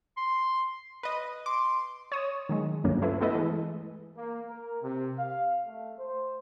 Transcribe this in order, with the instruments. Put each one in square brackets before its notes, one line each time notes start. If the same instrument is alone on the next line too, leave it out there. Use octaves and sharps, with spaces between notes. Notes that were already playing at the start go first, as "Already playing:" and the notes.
[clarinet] C6
[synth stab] B4 D#5
[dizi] C6 [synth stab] D6
[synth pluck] C#5 D#6
D#3 F#3 G#3
D2 G2 F#3 A3 A#3 C#4
A3 E4 F4 B4
A3 B3 E4 A4 B4 D#5
E3 G#3
[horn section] A#3
A#4
C3
F5
A3
C5